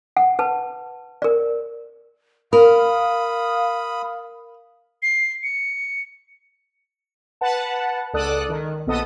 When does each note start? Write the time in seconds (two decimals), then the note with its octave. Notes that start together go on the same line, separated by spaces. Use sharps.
0.17 F#5
0.39 B4 A5
1.22 A#4 D5
2.53 A#4 F5 B5 D#6
5.02 C7
5.43 C#7
7.41 B4 F#5 A5
8.13 C#2 A4 D5 D#6 F#6
8.49 D#3
8.87 A#1 B3 A4 D#5 D#6